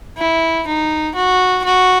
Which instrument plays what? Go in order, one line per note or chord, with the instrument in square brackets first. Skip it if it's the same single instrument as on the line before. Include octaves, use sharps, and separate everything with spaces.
[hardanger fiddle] E4
D#4
F#4
F#4